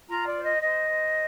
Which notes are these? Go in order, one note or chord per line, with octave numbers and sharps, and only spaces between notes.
F4 A#5
D5
C5
D#5
C5 D#5
C5